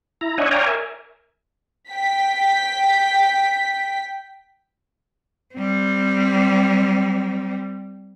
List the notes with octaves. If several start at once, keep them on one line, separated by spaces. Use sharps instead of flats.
E4 A#5
D4 C#5 D#5 E5 F#5 G#5
C#5 D5 F5 G5 G#5 A#5
A#4 E5 G#5
G5 B6
G3 C4